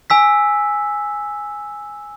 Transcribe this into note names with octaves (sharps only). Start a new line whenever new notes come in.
G#5 E6 B6